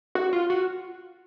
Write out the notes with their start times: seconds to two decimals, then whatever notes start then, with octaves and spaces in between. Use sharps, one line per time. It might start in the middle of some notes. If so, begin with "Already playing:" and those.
0.15 F#4
0.33 F4
0.50 F#4